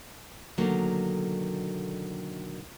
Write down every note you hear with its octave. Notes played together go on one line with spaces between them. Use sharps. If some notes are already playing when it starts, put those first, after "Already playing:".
B2 D3 D#3 F#3 A3 A#3